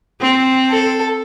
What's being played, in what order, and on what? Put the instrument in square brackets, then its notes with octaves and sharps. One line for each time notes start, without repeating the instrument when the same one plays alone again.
[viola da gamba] C4
[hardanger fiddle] A4